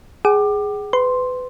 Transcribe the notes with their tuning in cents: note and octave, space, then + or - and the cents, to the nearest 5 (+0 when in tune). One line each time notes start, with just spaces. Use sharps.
G#4 +0 G5 -45 D6 +20
B4 +30 C6 +0